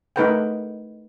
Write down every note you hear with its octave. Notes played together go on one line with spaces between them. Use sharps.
A3 D#4 A#4 B4 F#5 G5